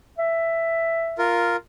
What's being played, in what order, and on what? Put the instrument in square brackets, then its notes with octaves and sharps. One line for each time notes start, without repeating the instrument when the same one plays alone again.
[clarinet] E5
[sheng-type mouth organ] F4 A#4